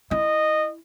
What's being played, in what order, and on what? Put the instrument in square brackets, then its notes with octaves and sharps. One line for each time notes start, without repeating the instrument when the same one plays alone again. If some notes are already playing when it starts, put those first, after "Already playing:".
[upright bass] E4 [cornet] D#5